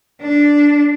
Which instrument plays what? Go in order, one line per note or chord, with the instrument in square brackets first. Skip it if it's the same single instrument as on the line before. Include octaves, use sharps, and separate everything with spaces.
[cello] D4